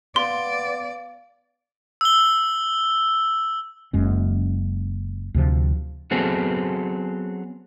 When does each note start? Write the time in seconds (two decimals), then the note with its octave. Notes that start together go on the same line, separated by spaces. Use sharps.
0.16 B3 D5 F5 C6
2.01 E6 G7
3.93 F#1 F#2 G#3 C#4
5.34 D2 C3 F3
6.11 F#3 B3 C4 G#4 A4